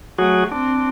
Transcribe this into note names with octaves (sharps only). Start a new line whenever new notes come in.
F#3 A3 F#4 G#4
C4 D4